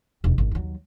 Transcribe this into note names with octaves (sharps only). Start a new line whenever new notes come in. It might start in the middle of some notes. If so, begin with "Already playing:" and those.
E1 D#2
G#1
D#2 F#3